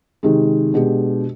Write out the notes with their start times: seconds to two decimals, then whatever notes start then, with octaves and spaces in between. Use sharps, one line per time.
0.23 C3 D#3 G#3
0.74 B2 G#3 D4 G4